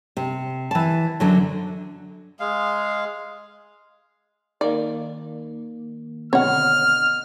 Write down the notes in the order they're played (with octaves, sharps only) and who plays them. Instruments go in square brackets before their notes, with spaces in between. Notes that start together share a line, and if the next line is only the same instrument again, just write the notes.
[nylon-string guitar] C3
E3 A5
F#2 D3 F#3
[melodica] G#3 F5
[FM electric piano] D#3 A#3 [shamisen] D5
[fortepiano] B2 D3 [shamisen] C#5 F#5 [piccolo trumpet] F6